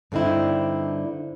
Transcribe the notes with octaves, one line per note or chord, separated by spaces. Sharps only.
G2 D3 C4 D#4 E4